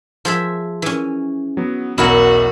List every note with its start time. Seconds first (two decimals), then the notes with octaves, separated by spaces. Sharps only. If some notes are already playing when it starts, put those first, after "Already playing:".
0.25 F3 G#4 E5
0.82 E3 C#4
1.57 F#3 B3
1.98 B1 E2 E4 F#4 A#4 F#5